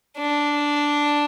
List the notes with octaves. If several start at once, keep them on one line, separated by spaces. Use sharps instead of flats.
D4